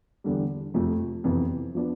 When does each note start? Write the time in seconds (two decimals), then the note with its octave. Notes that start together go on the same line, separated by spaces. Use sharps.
0.24 E2 D3 G3
0.74 F2 C3 F3 A3
1.24 F2 C3 E3 B3
1.75 F3 B3 D4